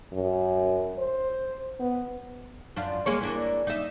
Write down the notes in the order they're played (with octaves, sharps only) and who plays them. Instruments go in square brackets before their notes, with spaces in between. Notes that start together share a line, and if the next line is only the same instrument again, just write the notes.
[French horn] F#2
C5
B3
[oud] F#2 D4 F4
G#3 A#3 C#5
E3 A#3 D4
D#4 E5